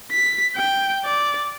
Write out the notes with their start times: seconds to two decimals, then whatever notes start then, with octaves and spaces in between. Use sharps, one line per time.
0.11 B6
0.56 G5
1.05 D5